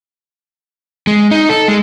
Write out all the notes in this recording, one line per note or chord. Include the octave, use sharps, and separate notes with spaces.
G#3
D#4
A4
G#3